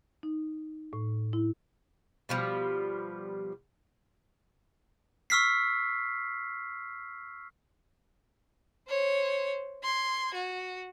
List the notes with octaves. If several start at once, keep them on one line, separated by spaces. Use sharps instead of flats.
D#4
A2
E4
B2 F3 G3
C#6 E6 F6 B6 C7
C5 C#5
C6 G#6
F#4